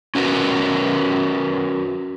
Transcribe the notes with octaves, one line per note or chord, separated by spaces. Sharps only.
C#4 F#4 A#4 B4